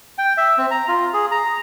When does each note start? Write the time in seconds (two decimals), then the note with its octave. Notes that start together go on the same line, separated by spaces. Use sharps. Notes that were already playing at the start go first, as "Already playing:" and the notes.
0.18 G5
0.37 E5
0.58 C4
0.71 A#5
0.88 F4
1.13 G#4
1.32 A#5